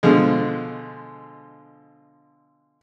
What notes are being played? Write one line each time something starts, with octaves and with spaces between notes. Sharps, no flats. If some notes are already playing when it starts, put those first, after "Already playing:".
B2 D3 F3 G#3